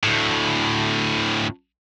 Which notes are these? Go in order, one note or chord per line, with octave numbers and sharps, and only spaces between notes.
D2 A2